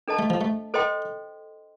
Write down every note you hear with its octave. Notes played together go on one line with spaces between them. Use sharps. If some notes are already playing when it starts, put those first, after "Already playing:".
D4 A4 D#5 A5
A3
F3
A3
A4 C5 D#5 G5 C6